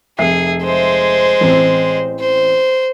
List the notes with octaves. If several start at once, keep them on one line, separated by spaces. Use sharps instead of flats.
F1 G#4 E5 C7
G#3 C5
A1 C4
C5